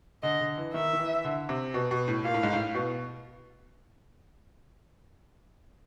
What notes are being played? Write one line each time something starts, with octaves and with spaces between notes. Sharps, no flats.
D3 D#5
D3
E3
D#3 E5
D#3
E3
D3
C3
B2
B2
A2
A#2 F5
A2
G#2
A2
B2